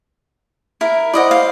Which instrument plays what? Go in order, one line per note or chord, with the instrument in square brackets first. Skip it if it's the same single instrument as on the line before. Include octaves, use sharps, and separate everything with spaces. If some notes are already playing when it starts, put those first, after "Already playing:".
[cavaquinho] E4 A#4
[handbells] E4 C5 [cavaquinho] D5 D#5 F#5
[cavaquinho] F5